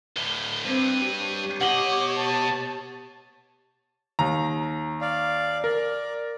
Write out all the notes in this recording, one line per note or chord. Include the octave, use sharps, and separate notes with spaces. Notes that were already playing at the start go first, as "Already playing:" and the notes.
D2 A2 G7
G2 C4 D#7
G4 C#5
B2 D#5 F#5 D6 F#7 G7
A5
D#2 A#5
D5 F5
A#4 D5